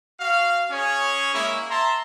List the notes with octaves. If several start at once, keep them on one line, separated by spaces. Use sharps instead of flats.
F#4 F5
C#4 G#4 C#5
G#3 A#3 E4
E5 A5 A#5 C6